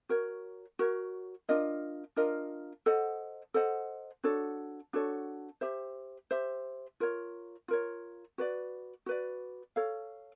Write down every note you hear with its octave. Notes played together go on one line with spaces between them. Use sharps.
F#4 A#4 C#5
F#4 A#4 C#5
D4 F4 A#4 D#5
D4 F4 A#4 D#5
A4 C5 D#5 F#5
A4 C5 D#5 F#5
D4 F#4 A4 C#5
D4 F#4 A4 C#5
G4 C5 E5
G4 C5 E5
F4 A#4 C#5
F4 A#4 C#5
F#4 B4 D5
F#4 B4 D5
A4 C#5 F5